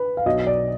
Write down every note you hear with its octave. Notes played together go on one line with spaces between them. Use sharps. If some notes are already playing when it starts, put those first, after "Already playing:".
Already playing: B4
F5
B1 B2 F#3 D#5
D5